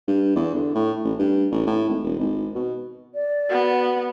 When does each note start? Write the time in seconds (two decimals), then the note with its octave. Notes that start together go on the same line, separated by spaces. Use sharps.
0.08 G2
0.36 E2
0.55 D3
0.75 A2
1.04 A1
1.19 G2
1.51 A1
1.67 A2
1.89 G#1
2.04 E1
2.19 G#1
2.55 B2
3.14 D5
3.50 B3 F#4